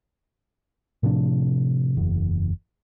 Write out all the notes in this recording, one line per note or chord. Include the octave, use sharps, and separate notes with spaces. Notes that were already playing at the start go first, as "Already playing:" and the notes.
A2 C3 F3 D4
F#1 E2